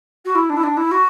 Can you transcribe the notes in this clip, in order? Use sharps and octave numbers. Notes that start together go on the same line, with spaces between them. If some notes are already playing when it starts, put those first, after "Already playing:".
F#4
E4
D4
E4
D4
E4
F#4